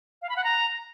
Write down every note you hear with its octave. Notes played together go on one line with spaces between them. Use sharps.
F5
B5
F#5
A#5